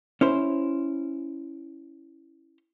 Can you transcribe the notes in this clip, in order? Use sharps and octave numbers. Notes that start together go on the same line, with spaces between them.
C#4 E4 C5